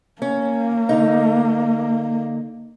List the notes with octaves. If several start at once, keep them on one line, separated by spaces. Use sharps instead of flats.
A#3 C#4
D3 D#4